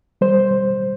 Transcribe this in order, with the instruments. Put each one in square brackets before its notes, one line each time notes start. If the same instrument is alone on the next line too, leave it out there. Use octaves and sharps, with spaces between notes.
[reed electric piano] G3 C5